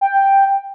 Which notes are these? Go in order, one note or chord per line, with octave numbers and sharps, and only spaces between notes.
G5